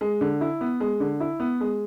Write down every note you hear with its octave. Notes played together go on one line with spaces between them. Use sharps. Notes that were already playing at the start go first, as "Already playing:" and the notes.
G#3
D3
E4
B3
G#3
D3
E4
B3
G#3